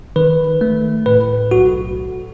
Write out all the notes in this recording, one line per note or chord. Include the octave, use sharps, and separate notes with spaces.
D#3 B4
A3
A2 B4
B1 F#4